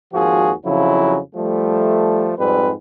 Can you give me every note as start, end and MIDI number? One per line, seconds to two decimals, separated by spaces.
0.13 0.52 32
0.13 0.52 39
0.13 0.52 53
0.13 0.52 66
0.13 0.52 68
0.64 1.18 41
0.64 1.18 49
0.64 1.18 53
0.64 1.18 54
0.64 1.18 64
1.35 2.32 53
1.35 2.32 55
1.35 2.32 57
2.39 2.72 41
2.39 2.72 44
2.39 2.72 55
2.39 2.72 60
2.39 2.72 71